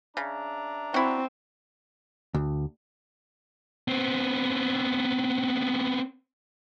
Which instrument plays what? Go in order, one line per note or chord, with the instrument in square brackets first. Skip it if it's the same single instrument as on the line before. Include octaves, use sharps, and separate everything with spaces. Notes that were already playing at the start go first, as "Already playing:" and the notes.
[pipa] C#3 [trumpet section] D4 E5 A#5
[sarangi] C4 [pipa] E4 F#4
[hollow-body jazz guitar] D2
[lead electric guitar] B3 C4